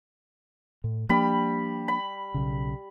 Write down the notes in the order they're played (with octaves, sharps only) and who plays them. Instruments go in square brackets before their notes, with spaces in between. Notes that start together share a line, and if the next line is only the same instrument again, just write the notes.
[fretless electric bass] A2
[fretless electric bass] F3 A#3 D4 [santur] G3 B5
[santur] B5
[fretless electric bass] B1 C#3